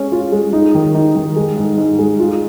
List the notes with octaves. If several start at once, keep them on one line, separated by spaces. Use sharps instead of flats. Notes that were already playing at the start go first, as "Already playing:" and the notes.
Already playing: G#3 C#4
F4
G#3
D#4
D#3
D#4
D#3
G#3
G#2
G#2
G#3
F4